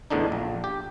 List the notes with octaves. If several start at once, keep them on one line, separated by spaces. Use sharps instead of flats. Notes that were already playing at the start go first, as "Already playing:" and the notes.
E2 A2 D3 D4 D#4
A#1
G4